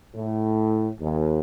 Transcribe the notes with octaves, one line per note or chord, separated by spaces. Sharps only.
A2
D#2